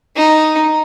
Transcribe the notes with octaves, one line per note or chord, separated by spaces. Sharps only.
D#4